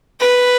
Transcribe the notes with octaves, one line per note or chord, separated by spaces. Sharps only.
B4